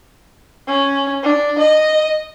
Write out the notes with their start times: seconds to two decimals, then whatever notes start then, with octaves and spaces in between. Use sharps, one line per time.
0.67 C#4
1.23 D4
1.59 D#5